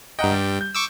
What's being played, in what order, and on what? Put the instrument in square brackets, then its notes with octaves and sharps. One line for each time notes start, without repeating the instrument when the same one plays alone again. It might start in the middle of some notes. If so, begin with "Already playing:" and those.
[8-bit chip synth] G2 G5 [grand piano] D#5 F#5 A#5
[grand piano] G3
G6
[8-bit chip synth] C#6 D6 E6